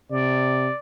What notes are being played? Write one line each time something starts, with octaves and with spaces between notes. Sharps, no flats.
C3 D5